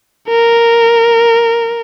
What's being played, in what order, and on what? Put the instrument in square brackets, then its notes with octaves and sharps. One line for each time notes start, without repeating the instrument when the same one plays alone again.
[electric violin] A#4